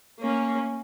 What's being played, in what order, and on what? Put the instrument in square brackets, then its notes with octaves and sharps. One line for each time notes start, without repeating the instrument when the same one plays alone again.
[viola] A#3 C#4